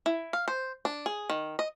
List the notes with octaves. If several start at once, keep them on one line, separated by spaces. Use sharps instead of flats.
E4
F5
C5
D4
G#4
D#3
D#5